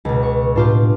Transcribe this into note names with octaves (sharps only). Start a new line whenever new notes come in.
C#2 B2
C#6
A2 D4 F4 G4